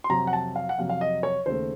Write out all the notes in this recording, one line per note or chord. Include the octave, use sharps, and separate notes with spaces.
C6
F2 C3 F#3 A#5
F#5
A5
F5
F#5
F2 C3 F#3 F5
F5
D#5
C#5
D#2 C#3 A3 C5